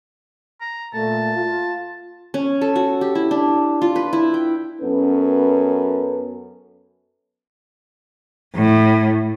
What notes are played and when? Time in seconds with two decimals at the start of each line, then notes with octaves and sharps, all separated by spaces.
0.61 A#5
0.94 A#2 A3 A5
1.35 F4
2.34 C#4
2.61 A4
2.76 F#4
3.01 G4
3.15 E4
3.31 D4
3.82 F4
3.96 B4
4.13 E4
4.34 G5
4.81 F#2 B3 C#4 A4 B4
8.55 A2